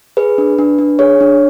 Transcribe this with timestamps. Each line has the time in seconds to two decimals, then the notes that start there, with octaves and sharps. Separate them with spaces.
0.17 G#4 B4
0.38 D4
0.58 D4
0.79 D4
0.99 G#4 C#5
1.21 D4